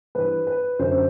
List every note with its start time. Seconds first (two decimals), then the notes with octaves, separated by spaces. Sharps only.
0.15 G2 E3 B4
0.47 B4
0.79 F#2 D3 C5